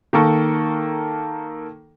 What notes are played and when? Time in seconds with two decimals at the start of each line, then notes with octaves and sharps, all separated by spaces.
0.13 D#3 A#3 A4 C#6